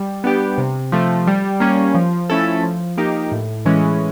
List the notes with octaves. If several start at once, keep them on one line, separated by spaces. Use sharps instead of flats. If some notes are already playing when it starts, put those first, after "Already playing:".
Already playing: G3
B3 D4 G4
C3
F3 A3
G3
A#3 C#4
F3
A3 C#4 E4 A4
F3
A#3 D#4 G4
A2
E3 G#3 C#4